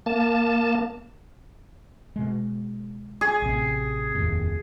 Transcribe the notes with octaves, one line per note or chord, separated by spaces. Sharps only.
A#3 A5
B2 G#3
G#4
A1 C3
F1 D#2 A2